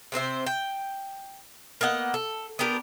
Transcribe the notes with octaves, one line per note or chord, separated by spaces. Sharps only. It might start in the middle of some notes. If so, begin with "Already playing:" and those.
C3 C4 C5 E5
G5
A#3 B3 D#5 F#5
A4
B3 D4 G4 A#4